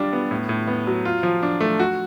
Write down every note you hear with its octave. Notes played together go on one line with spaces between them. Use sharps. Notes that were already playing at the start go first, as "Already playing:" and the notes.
Already playing: G3 D4 F4
B3
A2
A2
B3
F#3
F4
F3
D4
A3
F#4